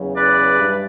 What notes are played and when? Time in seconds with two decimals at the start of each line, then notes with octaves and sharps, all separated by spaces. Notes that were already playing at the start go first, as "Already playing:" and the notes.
Already playing: E2 C#3 F#3
0.15 B4 D5
0.59 G2 E3 G3 D4